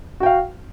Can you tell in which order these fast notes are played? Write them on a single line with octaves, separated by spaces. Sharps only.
F#4 G5 F5